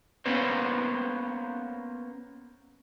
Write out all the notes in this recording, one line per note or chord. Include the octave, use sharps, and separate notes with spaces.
A#3 B3 C#4 A#4 C5